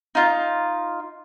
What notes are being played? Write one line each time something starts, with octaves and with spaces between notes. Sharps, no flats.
D#4 F4